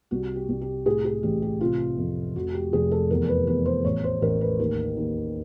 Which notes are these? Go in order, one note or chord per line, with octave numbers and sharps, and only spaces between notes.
C2 F#4
G4
C2
G4
A2 G#4
G#4
A1 G4
G4
C3 F4
F2
F1 F#4
G4
F1 G#4
A4
E2 A#4
B4
E2 B4
C5
A1 C#5
C5
A1 A#4
B4
D#2 A#4
D#2